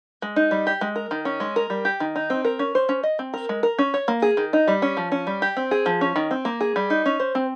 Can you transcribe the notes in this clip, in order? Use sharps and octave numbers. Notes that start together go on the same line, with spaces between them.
G#3
D#4
G3
G4
G#3
A#4
D#3
C#4
G#3
A#4
G3
G4
D#3
D#4
C4
A#4
C#4
C5
C#4
D#5
C4
A#4
G#3
A#4
C#4
C#5
A#3
G#4
D#3
D#4
G3
C#4
F3
C#4
G3
G4
C4
G#4
F3
C#4
D#3
C4
A#3
G#4
G3
D#4
C#4
C5
C4